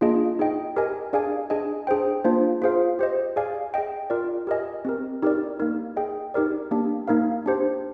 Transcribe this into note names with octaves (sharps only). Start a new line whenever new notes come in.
A#3 D4 F4 G#4 D#5
D#4 G#4 D#5 G5
G4 A#4 D#5 G#5
D4 G#4 D5 F5 G#5
D4 G#4 D#5 G#5
D4 G#4 C5 G5
A#3 D4 F4 C5
F4 G#4 C5 F5
G4 C5 D#5
G#4 D5 F5 G#5
G#4 D#5 G5
F4 A#4 D5
G4 A#4 D#5 G#5
C4 G4 A#4
D#4 G4 A#4 D5
A#3 D#4 A#4
G#4 D#5 G5
D#4 G4 A#4 D5
A#3 D4 G4
A#3 D#4 A#4 F5
D4 G4 C5